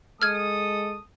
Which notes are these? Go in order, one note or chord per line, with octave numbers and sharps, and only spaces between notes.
G#3 A4 D#6 F6 G#6